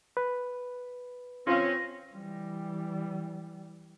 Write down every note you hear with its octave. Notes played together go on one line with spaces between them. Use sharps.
B4
C4 C#4 F4 F5 A#6
E3 G3